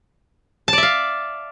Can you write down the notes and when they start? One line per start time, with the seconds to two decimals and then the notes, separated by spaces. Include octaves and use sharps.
0.68 A5
0.73 D5
0.78 E5
0.83 F5